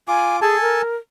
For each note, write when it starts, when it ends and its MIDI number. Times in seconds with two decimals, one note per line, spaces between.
0.08 0.40 65
0.08 0.37 80
0.08 0.40 86
0.41 0.60 68
0.41 0.82 69
0.41 0.82 80
0.41 0.82 81
0.61 0.96 70